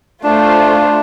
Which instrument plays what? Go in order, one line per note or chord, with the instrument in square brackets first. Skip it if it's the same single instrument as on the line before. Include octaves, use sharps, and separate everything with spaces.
[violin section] A3 F4 C5 [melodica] D4